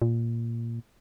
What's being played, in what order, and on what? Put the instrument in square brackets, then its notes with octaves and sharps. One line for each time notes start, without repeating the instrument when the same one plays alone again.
[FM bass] A#2